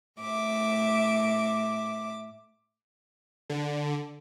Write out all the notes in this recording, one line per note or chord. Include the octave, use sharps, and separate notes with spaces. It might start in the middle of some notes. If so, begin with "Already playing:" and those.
A2 E5 D6
D3